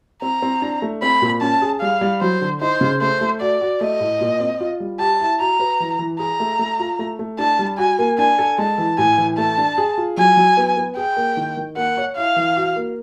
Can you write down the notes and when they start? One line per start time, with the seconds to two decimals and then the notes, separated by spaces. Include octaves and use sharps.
0.22 C4 A#5
0.42 C4
0.62 D4
0.82 A3
1.02 C4 B5
1.22 A#2
1.42 C#4 A5
1.62 G#4
1.81 G3 F5
2.01 G3
2.21 F#3 C5
2.41 D3
2.61 D#4 C5
2.81 C#3
3.01 A3 C5
3.21 A3
3.41 F#4 D5
3.61 F#4
3.81 A3 D#5
4.00 A2
4.21 A#2
4.40 C4
4.60 F4
4.80 G3
5.00 G4 A5
5.20 E4
5.40 F#4 A#5
5.60 B4
5.80 E3
5.99 E3
6.19 G#4 A#5
6.40 A3
6.59 A3
6.80 F4
6.99 A3
7.19 A3
7.39 D4 A5
7.59 G3
7.78 F#4 G#5
7.99 A#3
8.18 D4 G#5
8.38 A4
8.58 G#3 A5
8.78 E3
8.98 A2 G#5
9.18 E3
9.38 A3 A5
9.58 D4
9.78 G#4
9.98 F4
10.17 F#3 G#5
10.37 F#3
10.57 B3
10.77 B3
10.97 G#4 G5
11.17 A#3
11.37 D#3
11.57 D#3
11.76 A#3 F#5
11.97 C#5
12.16 E4 F5
12.36 E3
12.57 F#4
12.76 A#3